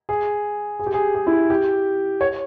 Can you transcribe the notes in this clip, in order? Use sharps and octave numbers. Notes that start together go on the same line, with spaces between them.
G#4
G#4
G4
G#4
G#4
E4
G4
C#5